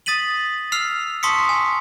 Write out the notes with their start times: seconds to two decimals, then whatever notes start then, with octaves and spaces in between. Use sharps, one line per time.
0.06 D#6 A6 B6 D#7 F#7
0.72 E6 F6 C7 F7
1.23 A5 C6 C#6 D#6 B6 C#7
1.49 G#5